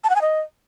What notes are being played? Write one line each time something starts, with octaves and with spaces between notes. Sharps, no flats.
A5
F#5
G#5
D#5